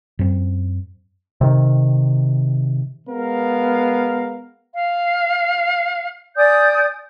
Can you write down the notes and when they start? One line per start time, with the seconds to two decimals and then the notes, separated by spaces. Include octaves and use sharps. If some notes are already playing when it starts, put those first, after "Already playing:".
0.19 F#2 C4
1.41 C3 D#3
3.08 G#3 B3 A#4 F5
4.74 F5
6.36 D5 G#5 D#6 G6